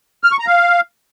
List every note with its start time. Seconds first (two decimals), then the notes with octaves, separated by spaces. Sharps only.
0.24 F6
0.31 C#6
0.39 A#5
0.47 F5